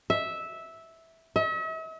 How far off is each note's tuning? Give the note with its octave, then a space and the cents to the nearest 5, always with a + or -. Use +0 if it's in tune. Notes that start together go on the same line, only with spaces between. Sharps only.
E5 -10
E5 -45